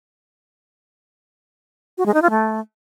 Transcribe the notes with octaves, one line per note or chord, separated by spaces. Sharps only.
F#4
G#3
D#4
F4
A3